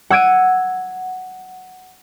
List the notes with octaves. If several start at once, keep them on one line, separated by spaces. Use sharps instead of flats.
F#5 E6 G#6 D7 D#7